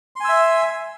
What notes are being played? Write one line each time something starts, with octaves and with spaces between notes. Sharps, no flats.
E5 G#5 C6 E6